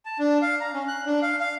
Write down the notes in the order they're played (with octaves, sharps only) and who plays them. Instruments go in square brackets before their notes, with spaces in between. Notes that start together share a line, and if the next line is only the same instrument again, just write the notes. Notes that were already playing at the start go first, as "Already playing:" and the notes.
[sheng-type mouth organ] A5
D4
F5
A#5
C#4
F#6
D4
F5
F5